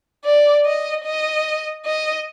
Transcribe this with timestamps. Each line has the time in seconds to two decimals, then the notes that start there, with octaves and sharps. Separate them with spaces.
0.25 D5
0.66 D#5
1.05 D#5
1.86 D#5